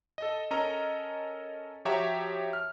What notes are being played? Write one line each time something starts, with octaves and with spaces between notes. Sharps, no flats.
A4 D#5
C#4 A4 A#4 D#5 A#5
F3 F#4 G4 C#5 E5 A#5
F6